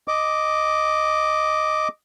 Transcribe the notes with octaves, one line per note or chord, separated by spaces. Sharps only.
D#5 D6